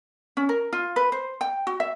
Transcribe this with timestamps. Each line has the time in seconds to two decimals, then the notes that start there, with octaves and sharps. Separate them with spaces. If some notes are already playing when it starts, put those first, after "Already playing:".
0.37 C#4
0.49 A#4
0.73 F4
0.96 B4
1.12 C5
1.41 G5
1.67 F#4
1.80 E5